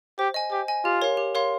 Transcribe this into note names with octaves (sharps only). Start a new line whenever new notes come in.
G4 C5
D#5 G#5
G4 C5
D#5 G#5
F4 G4
A#4 C#5 F5 C6
G4
A#4 C#5 F5 C6